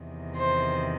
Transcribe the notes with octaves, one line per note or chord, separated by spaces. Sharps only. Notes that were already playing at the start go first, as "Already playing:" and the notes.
Already playing: E2 C3 D#3
C5